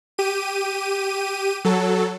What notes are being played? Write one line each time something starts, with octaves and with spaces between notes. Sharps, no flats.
G4 D#7
F#3 A4